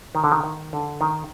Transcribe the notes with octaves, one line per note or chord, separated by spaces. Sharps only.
D#3
D3
D#3
D#3
D3
D#3